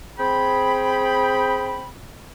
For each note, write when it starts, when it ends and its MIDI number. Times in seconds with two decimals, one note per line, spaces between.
0.19 1.86 60
0.19 1.86 68
0.19 1.86 79
0.19 1.86 83